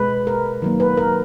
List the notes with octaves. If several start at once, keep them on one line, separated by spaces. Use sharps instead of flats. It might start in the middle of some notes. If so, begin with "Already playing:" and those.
Already playing: B2 G#3 B4
A#4
D#3 F#3 A#3
B4
A#4